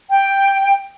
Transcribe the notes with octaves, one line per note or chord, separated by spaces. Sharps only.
G5